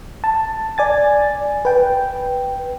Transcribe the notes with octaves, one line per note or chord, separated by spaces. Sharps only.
A5
D5 G#5 A6
B4 G5